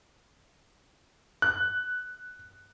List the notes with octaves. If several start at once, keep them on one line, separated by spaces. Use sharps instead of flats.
F#6